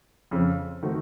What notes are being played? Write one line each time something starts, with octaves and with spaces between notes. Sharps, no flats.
F2 C#3 F3
D#3 A3 C4 F#4